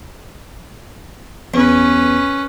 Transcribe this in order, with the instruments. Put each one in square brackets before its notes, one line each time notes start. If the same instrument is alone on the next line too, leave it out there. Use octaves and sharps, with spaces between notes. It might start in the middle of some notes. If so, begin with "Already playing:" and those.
[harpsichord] E2 [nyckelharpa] C#4 B4